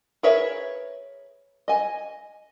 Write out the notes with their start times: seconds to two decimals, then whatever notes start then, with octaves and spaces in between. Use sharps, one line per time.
0.23 G#4 A#4 B4 C#5 E5
1.68 D#5 G#5